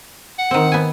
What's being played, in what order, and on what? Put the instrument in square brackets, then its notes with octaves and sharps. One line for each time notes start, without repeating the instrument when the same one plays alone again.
[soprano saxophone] F#5
[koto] D#3 C4
B3 G#5